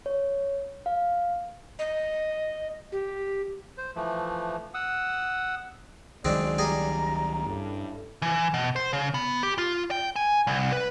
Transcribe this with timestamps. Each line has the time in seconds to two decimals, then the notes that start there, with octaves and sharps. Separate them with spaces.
0.06 C#5
0.86 F5
1.79 D#5
2.92 G4
3.78 C5
3.96 E3 F3 A3
4.74 F#5 D#6 E6
6.25 C#2 D#3 F#3 G#3 C4 D4 D5
6.58 G3 G#4 D#5 A#5
7.47 G2 C#4 E4 A4
8.22 E3
8.54 B2
8.76 C5
8.93 C#3
9.14 B3
9.43 G4
9.58 F4
9.91 G5
10.16 G#5
10.47 C2
10.72 B4